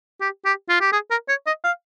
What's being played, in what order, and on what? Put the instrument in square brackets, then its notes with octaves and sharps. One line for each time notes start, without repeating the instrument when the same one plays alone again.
[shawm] G4
G4
F4
G4
G#4
A#4
C#5
D#5
F5